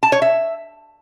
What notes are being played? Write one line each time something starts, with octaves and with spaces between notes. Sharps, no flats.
A5
C#5
E5